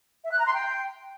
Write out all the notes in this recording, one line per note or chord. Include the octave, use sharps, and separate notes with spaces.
E5
F#6
A#5
C6
G5